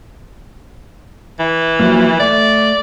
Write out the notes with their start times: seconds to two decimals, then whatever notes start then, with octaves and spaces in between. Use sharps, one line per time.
1.39 E3
1.80 F3 F#3 A#3
2.20 A3 D5